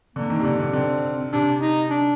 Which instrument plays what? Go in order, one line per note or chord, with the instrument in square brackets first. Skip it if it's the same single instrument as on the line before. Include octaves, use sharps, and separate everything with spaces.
[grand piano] D3 [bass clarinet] A#3
[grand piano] D#3
C3
D3
D3
[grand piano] D3 [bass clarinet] C4
[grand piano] C3 [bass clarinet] D4
[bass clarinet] D#4
D4